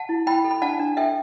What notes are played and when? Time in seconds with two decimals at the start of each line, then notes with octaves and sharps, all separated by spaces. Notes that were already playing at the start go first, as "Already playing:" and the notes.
Already playing: F#5 A5
0.09 E4
0.26 E4 G5 B5
0.44 A4
0.51 B5
0.62 D4 F#5 A5
0.79 D4
0.97 A4 E5 G5